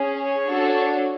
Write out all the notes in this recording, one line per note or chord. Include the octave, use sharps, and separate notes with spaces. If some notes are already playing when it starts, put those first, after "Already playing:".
Already playing: C#4 G#4
C#5
D4 F#4 A4